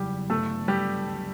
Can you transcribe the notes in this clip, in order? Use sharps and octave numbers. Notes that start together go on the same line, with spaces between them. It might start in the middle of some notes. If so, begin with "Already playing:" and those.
Already playing: F#1 E2 C#3 F#3 G3 G4
G1 G2 F#3 A3 B3 D4 A4
G3 G4
D2 D3 G3